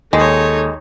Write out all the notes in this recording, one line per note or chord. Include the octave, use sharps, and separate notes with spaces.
D#2 G#3 D#4 A4 C#5